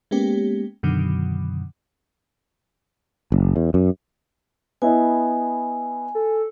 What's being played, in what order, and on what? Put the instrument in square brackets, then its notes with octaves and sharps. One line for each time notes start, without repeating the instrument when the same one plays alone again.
[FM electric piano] G#3 A#3 B3 C#4 G4
F#2 B2 D3 D#3 F#3
[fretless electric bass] F#1
E2
F#2
[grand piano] B3 E4 D#5 [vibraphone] G#5
[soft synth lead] A4